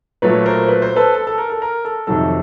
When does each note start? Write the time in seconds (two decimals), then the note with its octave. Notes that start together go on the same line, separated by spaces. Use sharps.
0.22 A#2 F#3 A3 B4 C#5
0.46 A#4 C5
0.68 B4
0.82 C5
0.96 A4 B4
1.15 A4
1.27 A4
1.38 A#4
1.50 A4
1.62 A#4
1.85 A4
2.07 F2 C3 D#3 F#3 A4